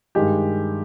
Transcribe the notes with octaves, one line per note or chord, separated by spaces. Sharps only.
G2 D#3 G#3 G4